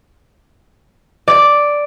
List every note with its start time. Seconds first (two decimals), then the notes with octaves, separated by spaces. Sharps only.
1.28 D5